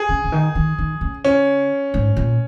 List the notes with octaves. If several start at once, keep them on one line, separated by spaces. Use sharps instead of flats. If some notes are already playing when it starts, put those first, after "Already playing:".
Already playing: G#4
C#3
C#3
D#3
D#3
D#3
C#3
C#4
G#2
A#2